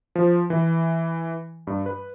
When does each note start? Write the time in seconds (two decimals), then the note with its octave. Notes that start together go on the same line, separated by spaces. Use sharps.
0.15 F3
0.50 E3
1.67 G2
1.86 B4